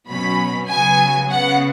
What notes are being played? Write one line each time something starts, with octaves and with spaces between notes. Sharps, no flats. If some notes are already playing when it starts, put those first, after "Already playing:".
B2 F#3 C#4 B5
C#3 F#3 B3 G#5
C#3 B3 F#5